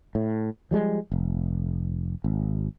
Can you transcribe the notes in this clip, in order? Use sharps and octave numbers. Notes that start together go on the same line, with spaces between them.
A2
F3 G3 G#3
F1
G#1